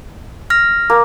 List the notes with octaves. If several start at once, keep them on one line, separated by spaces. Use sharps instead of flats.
F6 A#6
A#3